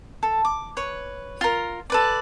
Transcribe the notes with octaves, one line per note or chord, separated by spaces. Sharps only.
A4
D6
B4 C#5
F4 A#4
A4 B4 D5